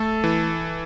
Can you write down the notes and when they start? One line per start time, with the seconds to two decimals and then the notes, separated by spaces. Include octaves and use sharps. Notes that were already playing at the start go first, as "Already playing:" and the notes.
Already playing: A3 A4
0.24 E3